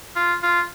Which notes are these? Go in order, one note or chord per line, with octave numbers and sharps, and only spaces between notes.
F4
F4